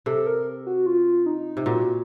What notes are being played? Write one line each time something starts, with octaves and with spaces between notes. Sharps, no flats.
C3 A4
A#4
F#4
F4
D#4
C3
A#2 F#4